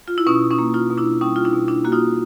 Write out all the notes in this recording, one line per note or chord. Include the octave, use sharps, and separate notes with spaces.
F4
E4
B2 C#4 D#4
C#4 D#4
A#3
D#4 F4
B2
D4 E4
G3 C#4 D#4
F4
D4 E4
B2
D4 E4
A#3 F#4
D#4 F4